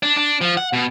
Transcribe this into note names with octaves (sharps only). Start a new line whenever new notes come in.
D4
D4
F3
F#5
B2